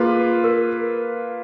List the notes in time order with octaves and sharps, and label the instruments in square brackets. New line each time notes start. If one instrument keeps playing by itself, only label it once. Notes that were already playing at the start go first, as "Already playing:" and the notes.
Already playing: [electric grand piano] A#3 F4 B4 [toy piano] G#4
[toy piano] A#4